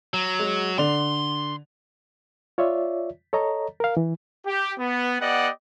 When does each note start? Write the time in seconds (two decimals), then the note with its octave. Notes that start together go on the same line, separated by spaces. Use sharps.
0.14 F#3
0.39 G#3
0.78 D3 D5 C6 F7
2.58 F4 C#5 D5 E5
3.33 A4 C#5 D#5 A#5
3.80 A#4 F5
3.97 E3
4.47 G4
4.79 B3
5.21 B3 G4 D5 D#5 F#5